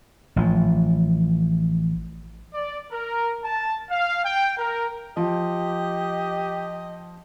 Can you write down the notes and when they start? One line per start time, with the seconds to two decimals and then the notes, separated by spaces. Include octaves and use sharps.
0.36 A1 F3
2.54 D5
2.92 A#4
3.44 A5
3.90 F5
4.25 G5
4.58 A#4
5.17 F3 G4 D#5